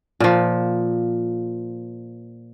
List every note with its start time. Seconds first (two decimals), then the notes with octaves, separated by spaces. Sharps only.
0.20 A#2 F3